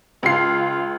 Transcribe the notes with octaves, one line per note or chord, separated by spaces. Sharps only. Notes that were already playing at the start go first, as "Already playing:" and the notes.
C#2 F4 C7